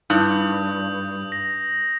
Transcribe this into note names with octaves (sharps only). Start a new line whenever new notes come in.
G2 D#4 E4 D#6 G6 F#7
A#6